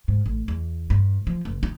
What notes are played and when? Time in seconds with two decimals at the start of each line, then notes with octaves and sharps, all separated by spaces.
0.08 G#2
0.26 A1
0.48 E2
0.90 G2
1.27 F3
1.45 F#1
1.63 D#4